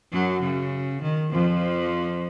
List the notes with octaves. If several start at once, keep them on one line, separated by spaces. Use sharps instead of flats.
F#2 F#3
C#3
D#3
F2 F3